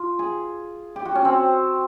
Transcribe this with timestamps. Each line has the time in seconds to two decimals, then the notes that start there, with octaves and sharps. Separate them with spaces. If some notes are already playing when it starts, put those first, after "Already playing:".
Already playing: F4
0.19 G#4
0.96 G4
1.05 F#4
1.15 C#4
1.25 C4